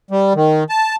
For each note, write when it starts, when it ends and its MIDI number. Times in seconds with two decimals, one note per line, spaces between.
0.11 0.33 55
0.35 0.64 51
0.69 0.96 81